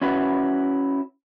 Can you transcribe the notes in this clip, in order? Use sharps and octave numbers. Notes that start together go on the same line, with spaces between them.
C#4 E4 F#4 B4